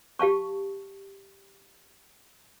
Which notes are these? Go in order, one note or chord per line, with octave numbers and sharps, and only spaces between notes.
G4 F5 A5 C#6